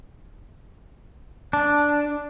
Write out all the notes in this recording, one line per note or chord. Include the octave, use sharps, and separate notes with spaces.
D4